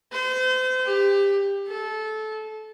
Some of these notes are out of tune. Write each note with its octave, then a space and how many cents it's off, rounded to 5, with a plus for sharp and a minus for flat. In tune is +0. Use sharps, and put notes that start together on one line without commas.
C5 -35
G4 +20
A4 -20